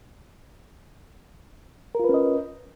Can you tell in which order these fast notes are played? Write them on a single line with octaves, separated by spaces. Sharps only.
A#4 F4 B4 C#4 D#5